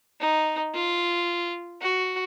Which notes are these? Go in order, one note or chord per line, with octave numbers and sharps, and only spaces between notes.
D#4
F4
F#4